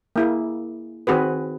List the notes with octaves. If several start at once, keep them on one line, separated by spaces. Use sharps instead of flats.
A#3 E4 G#4
D#3 C4 F#4 G#4 B4